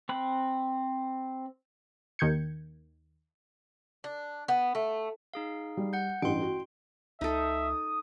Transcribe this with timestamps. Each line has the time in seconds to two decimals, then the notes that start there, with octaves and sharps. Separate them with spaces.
0.09 C4 B5 F#6
2.19 D#2 D#3 G6 G#6 C#7
4.04 D4
4.48 B3
4.75 A3
5.34 D#4 G#4 F5
5.77 G3
5.93 F#5 G6
6.22 A1 G2 G5 C6
6.42 F#4
7.21 C#2 D#4 A4 E5 D#6